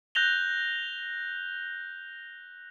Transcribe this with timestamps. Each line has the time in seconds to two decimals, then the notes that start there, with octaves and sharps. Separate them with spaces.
0.15 F#6 G6 A#6 F7 G7